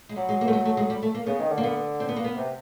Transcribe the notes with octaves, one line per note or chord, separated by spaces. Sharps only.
G#3
F#3 G3
G#3
A#3
A3
G#3
A3
G#3
G3
A3
A#3
C#3 B3
D#3
D3
A#3
B3
C4
B3
A#3
B3
C3